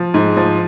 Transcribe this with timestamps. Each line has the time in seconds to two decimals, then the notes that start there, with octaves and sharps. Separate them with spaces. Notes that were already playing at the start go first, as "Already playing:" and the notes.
Already playing: F3
0.14 G#2
0.37 F3